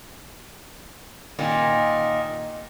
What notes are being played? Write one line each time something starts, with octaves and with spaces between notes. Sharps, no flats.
A#2 D#3